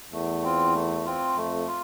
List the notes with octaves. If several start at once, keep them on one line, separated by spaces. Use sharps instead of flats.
E2 A3
C4 F4
A3
C4 F4
F2 A3
F4